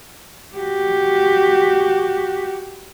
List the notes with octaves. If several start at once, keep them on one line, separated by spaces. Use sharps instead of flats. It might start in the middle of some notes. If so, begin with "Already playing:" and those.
F#4 G4